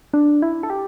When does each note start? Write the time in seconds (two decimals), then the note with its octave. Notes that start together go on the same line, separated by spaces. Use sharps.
0.13 D4
0.42 E4
0.63 A4
0.70 G4